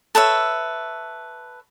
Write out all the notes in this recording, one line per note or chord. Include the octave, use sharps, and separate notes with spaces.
A4 B4 C#5 E5